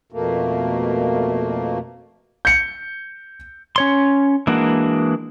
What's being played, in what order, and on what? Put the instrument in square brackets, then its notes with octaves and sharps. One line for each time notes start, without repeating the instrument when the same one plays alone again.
[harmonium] F2 B2 A3 A#3
[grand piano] G6 C#7
[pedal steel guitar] C#4 C#5 C6
E3 G#3 A#3 D4 F#4